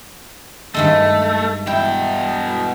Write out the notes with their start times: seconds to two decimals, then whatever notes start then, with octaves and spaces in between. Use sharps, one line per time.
0.74 G2 D#3 G#3 A3
1.67 B2 E4 G5